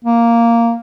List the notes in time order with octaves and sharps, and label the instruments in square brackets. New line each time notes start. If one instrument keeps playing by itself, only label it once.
[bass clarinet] A#3